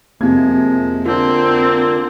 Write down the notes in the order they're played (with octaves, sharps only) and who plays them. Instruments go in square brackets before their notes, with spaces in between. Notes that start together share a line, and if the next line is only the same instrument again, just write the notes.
[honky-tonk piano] F2 C3 G#6 [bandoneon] F3 G#3 [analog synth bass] A#3
[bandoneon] D3 A#3 [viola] C4 [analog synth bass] F4